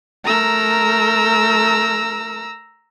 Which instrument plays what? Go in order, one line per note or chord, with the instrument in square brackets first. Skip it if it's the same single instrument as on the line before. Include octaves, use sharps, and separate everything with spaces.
[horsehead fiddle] A3 A#4 [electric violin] A#5 E6